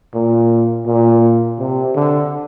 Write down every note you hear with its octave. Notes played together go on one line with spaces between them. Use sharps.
A#2
A#2
C3
D3